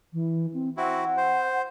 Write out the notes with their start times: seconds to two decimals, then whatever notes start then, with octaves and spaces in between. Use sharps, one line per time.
0.13 E3
0.54 C4
0.77 C4 E4 F#4 F#5
1.17 C5